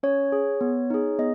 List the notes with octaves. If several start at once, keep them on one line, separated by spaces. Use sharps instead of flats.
C#4 C#5
G#4
B3
D#4 G#4
B3 D#5